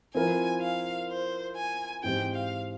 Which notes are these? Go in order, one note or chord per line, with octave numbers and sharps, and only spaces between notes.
F3 C4 E4 A#4 G#5
F5
C5
G#5
G#2 E3 G#3 C4 G4 G5
F5